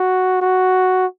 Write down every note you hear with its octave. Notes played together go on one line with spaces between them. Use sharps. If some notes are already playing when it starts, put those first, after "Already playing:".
Already playing: F#4
F#4